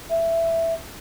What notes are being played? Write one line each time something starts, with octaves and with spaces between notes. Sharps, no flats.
E5